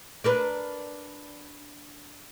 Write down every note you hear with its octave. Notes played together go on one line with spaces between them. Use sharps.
D4 A#4 B4